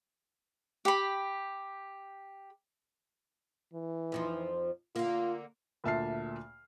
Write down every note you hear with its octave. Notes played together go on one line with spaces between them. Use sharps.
G4 B5
E3
F2 F3 D#4
D3 A#3 F4
D2 A#2 E5 A5 F6 C7